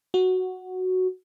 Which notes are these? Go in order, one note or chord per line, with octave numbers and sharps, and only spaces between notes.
F#4